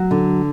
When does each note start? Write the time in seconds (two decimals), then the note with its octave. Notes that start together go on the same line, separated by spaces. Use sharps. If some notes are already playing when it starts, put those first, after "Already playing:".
Already playing: F#3 F#5
0.11 D3